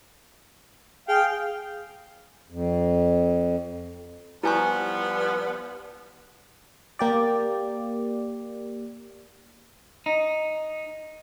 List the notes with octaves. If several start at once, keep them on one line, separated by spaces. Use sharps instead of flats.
G#4 F5 G5
F2
F3 G3 B3 E4 G#5 C#6
A#3 G4 D5
D#4